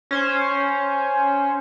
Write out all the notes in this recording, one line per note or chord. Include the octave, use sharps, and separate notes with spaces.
C#4 C5